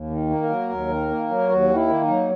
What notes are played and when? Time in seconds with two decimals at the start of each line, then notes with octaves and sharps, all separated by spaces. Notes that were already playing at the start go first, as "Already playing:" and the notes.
Already playing: D#2
0.10 D#3
0.30 A#3
0.43 A#4
0.49 F#3
0.69 D#2
0.89 D#3
1.09 A#3
1.29 F#3
1.48 D#2 F#4
1.68 D#3
1.74 E4
1.88 A#3
2.01 D#4
2.08 F#3